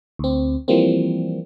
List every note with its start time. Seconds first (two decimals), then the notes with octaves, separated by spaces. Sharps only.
0.19 D2 C4
0.68 E3 F3 G3 A#3 C4